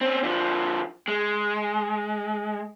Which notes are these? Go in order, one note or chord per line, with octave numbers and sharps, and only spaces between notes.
C4 C#4
D3 F3
G#3